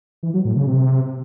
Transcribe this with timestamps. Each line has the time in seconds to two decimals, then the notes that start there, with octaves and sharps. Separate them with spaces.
0.23 E3
0.34 F#3
0.45 A2
0.56 C#3
0.67 C3